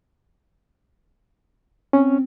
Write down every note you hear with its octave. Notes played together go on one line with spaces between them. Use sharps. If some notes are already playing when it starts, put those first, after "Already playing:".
C4 C#4